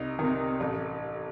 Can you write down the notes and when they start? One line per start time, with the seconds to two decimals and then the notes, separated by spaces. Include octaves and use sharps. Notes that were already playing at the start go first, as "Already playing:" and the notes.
Already playing: C2 D#4
0.19 C3 D#3
0.60 A1